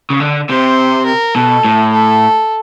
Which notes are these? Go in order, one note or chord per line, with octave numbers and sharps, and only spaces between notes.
C#3
D3
C3 C5
A#4
B2 A4
A2
A4